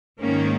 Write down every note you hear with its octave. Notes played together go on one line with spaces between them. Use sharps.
G#2 D#3 A#3 C#4